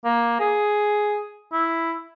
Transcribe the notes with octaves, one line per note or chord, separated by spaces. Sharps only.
A#3
G#4
E4